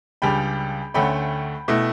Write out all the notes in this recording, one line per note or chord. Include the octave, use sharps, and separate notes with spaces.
C#2 C#3 G3 D4 G5 B5
D2 D3 A3 C#4 G5 B5
B2 A3 E4